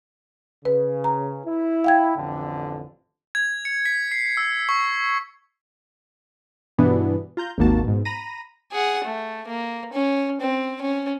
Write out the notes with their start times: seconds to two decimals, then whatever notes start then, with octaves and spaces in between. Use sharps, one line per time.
0.65 C#3 B4
1.04 A#5
1.46 E4
1.84 F5 G5 G#6
2.17 A1 F2 D3
3.35 G#6
3.65 C#7
3.85 B6
4.12 C7
4.37 E6
4.69 C#6
6.78 G2 B2 E3 B3 D4
7.37 F4 A#5 G6
7.58 G#1 D#2 D#3 A#3 F#4 A5
7.84 G#2 B2
8.05 A#5 B5 A#6 D#7
8.72 G#4 F#5
9.04 A3
9.47 A#3
9.93 C#4
10.41 C4
10.81 C#4